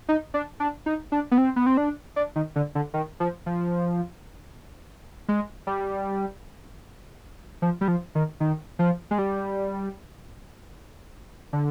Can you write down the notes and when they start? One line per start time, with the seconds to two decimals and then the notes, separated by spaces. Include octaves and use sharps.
0.09 D#4
0.34 D4
0.60 D4
0.86 D#4
1.12 D4
1.31 B3
1.38 C4
1.56 B3
1.66 C4
1.77 D4
2.16 D4
2.36 D#3
2.56 D3
2.75 D3
2.94 D#3
3.20 F3
3.46 F3
5.28 G#3
5.67 G3
7.62 F3
7.81 G3
7.88 F3
8.15 D#3
8.40 D#3
8.79 F3
9.11 G#3
9.18 G3
11.53 D3